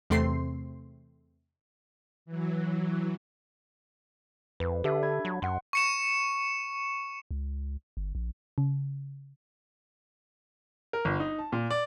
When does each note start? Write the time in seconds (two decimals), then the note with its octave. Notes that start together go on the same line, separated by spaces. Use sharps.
0.10 E2 C3 A3 C4 C6 C7
2.25 E3 F#3
4.60 F2 B4
4.84 D3 G4 A4 E5
5.03 D4 B5 G#6
5.25 F#3
5.42 F#2 F#5 C6
5.73 C#6 C#7 E7
7.31 C#2
7.97 G1
8.15 A#1
8.58 C#3
10.93 A#4
11.05 G1
11.20 D#4
11.39 A5
11.52 A#2
11.71 D5